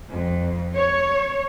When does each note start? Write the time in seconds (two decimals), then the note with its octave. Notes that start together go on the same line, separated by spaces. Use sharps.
0.10 F2
0.76 C#5